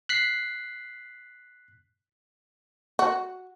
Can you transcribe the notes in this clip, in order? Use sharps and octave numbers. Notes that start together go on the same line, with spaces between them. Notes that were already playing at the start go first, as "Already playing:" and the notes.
F#6 B6 C7
F#4